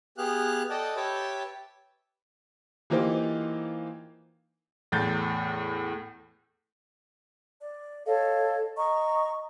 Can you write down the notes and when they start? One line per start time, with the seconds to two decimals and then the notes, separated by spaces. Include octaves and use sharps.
0.18 B3 G4 G#4 F5 F#6
0.70 A4 D5 D#5 F#5 G5 A5
0.96 G4 B4 C#5 E5 G5 A5
2.90 E3 A#3 D#4 F4 G4 C5
4.92 E2 A2 G6 A6
7.60 D5
8.06 A4 C#5 D#5 F5
8.77 D#5 A#5 C#6